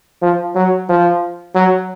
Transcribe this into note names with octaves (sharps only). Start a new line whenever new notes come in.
F3
F#3
F3
F#3